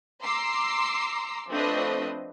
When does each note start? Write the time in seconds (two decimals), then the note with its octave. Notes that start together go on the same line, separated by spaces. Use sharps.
0.23 A#5 C6 D6 E6 C7
1.49 F3 A3 C4 D4 B4 D#5